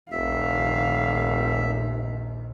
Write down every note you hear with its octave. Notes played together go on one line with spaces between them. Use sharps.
F1 A#1 D#2 D#3 E5 F5